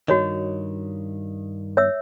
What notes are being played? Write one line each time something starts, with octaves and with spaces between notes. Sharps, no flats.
G2 D#3 F#4 C#5 D#5
C#5 E5 E6